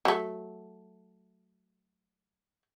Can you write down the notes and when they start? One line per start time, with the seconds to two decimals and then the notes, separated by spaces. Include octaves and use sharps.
0.05 F#3 A3